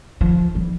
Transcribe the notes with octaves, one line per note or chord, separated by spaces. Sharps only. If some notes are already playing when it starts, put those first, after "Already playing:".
F3
G3